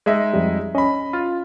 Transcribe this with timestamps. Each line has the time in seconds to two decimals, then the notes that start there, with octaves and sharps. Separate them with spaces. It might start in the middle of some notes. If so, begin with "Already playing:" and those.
0.06 G#3 D#4 E5
0.34 F2 G3
0.75 C#4 D#5 B5
1.13 F4